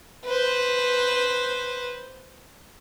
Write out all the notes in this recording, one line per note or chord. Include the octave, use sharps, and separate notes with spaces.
B4 C5